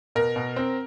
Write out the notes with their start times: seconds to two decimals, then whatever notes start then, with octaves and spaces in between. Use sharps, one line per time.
0.16 B2 A#4
0.36 B2
0.56 C4